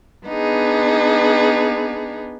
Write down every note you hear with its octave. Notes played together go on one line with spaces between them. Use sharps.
B3 D4 D#4 G#4